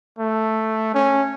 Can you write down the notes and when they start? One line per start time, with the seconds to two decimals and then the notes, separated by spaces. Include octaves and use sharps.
0.19 A3
0.94 C#4